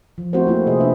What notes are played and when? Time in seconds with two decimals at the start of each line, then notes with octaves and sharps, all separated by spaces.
0.18 F3
0.33 A3 C4 F#4 G4 A#4 C5
0.47 A#3 E4 F4
0.66 C3 G#4 D#5
0.80 C3 A#3 D4 B4 C5 E5